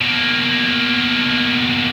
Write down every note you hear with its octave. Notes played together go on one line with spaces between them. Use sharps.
B2 A#3